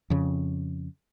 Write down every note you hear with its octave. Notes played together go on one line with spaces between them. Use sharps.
F2 C#3